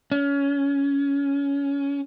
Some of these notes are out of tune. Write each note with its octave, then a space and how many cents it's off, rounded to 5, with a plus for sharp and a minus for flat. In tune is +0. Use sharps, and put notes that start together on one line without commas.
C#4 +20